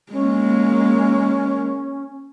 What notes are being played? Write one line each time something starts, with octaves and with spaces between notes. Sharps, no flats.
G#3 A#3 C#4